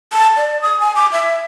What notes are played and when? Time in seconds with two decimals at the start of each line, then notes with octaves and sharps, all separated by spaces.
0.12 A5
0.37 D5
0.62 D#6
0.80 G#5
0.96 D6
1.12 E5